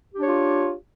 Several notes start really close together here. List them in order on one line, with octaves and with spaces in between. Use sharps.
G4 D4 C#5 F4